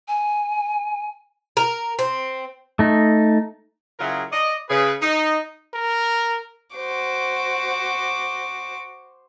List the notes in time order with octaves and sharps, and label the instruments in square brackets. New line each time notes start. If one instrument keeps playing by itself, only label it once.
[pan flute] G#5
[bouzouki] A#4
C4
[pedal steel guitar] A3 D#4
[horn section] C#3 F#3 E4 F4 G#4 A#4
D5 D#5
C#3 G#4 B4
D#4
[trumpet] A#4
[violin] F#4 [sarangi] C5 [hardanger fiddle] D6